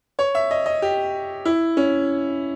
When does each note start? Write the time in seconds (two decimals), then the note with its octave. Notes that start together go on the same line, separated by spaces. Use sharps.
0.19 C#5
0.35 E5
0.51 D#5
0.66 D#5
0.82 G4
1.45 E4
1.77 C#4